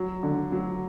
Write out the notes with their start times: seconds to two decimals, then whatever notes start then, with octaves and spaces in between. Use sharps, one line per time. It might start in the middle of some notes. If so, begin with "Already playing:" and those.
Already playing: F#3
0.23 D3
0.52 F#3